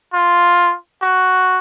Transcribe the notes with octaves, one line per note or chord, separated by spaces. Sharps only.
F4
F#4